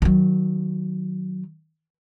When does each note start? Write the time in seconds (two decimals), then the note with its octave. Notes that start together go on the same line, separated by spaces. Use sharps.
0.02 D#3 F#3